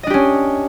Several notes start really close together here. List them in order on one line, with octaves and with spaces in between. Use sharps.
D#5 D4 G4 C#4